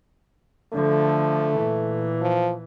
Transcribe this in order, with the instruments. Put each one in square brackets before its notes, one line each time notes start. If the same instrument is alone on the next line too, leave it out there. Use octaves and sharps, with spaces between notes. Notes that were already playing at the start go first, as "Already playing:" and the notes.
[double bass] D3 F3 [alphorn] A3
[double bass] A#2 E3
[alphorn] F3